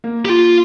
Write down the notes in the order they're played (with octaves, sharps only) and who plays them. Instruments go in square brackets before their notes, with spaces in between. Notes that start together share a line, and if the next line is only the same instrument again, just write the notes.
[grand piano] A#3
[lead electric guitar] G4
F4